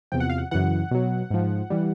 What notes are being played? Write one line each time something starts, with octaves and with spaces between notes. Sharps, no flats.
E2 C3 F3 G5
F#5
F5
F#5
F#2 C#3 E3 F#5
B2 F#3
G#2 F3
E3 G3